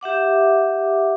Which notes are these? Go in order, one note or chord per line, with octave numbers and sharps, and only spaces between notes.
G4 E5 F#5 D6